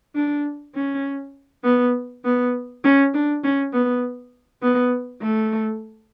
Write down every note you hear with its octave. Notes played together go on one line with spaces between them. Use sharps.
D4
C#4
B3
B3
C#4
D4
C#4
B3
B3
A3